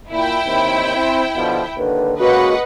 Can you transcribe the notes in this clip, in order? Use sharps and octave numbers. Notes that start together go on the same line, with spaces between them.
A#2 E4 G5
D#2 D#3 C4
C4
B2 D3 F3
D#2 D3 B4
C#2 G#3 A#3 F#4 B4 D#5 F#5